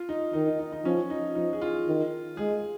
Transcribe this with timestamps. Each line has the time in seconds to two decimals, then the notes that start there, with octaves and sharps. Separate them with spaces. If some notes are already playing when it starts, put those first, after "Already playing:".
Already playing: F4
0.09 D#4
0.33 D#3 D#4
0.47 D#4
0.59 D#4
0.72 D#4
0.85 F3 C#4
1.10 D#4
1.35 F3 D#4
1.53 G#4
1.61 F4
1.87 D#3
2.37 G#3 G#4